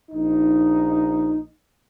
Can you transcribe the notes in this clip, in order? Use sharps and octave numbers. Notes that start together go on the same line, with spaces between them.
A#1 D#4